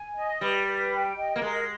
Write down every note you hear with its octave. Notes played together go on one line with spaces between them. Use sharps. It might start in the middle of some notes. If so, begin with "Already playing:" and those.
Already playing: G#5
D#5
G3 B4
B4
G5
D#5
A#3
G#3 A#4